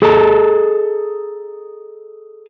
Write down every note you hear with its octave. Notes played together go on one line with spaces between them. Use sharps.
G#4 A4 D#5 A5 A#5